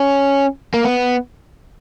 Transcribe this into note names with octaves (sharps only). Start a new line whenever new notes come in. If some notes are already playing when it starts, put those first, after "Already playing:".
Already playing: C#4
A#3
B3